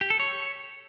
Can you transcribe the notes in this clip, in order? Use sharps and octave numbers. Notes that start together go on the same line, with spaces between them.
G4
A4
C#5